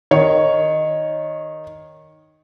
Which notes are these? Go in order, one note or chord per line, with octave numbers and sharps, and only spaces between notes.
D#3 C#5